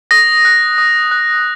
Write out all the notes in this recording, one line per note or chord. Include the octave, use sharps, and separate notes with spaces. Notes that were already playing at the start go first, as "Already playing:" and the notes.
D#6 A#6
F#6
D#6
F#6